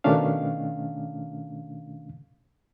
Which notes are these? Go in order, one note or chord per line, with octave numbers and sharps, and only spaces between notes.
B2 D#3 A3 C#4 D4 F5